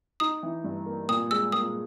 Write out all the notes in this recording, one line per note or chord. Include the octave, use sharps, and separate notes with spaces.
D#4 D#6
E3
G2
A#3
A#2 D#6
G#3 E6
A#2 D#6